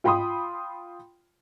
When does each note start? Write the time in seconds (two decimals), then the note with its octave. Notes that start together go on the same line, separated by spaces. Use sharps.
0.04 F4 G5 B5 C6 D#6